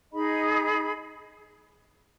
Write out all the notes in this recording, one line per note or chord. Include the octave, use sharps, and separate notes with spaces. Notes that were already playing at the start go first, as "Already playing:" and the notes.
D#4 G#4 D#5 B5